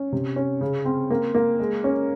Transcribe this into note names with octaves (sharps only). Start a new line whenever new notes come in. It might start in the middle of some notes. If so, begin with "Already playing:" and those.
Already playing: C#4
C3
C#4
C#3
C4
A#3
A#3
G#3
C#4